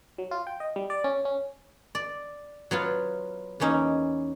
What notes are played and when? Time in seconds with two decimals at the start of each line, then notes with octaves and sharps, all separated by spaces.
0.18 F#3
0.31 F4
0.47 G5
0.60 D#5
0.76 G3
0.90 D5
1.04 C#4
1.25 C#4
1.95 D5
2.71 F#3 B3 F4
3.60 E2 A#3 C#4 D#4